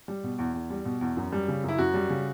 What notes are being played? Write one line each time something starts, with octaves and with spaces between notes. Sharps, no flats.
G3
B2
E2
E2
G3
B2
E2
F#2
G3
C#3
F#2 E4
F#2 F#4
G3
C#3